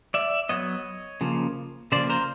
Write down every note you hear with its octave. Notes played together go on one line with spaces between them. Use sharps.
D5 E5
F#3 B3 C#5 D#5
C#3 F3 A#3
C#3 F3 A#3 C5 D5
A#4 C5